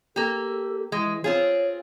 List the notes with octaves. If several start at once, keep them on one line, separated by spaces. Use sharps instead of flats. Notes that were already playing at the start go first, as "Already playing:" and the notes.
A#3 G4 A4
E3 G#3
C4 F4 G#4 C#5